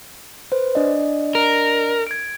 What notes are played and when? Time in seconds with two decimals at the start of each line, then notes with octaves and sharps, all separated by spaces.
0.52 B4 C5
0.75 D4 D5 D#5
1.35 A#4
2.07 G#6 D7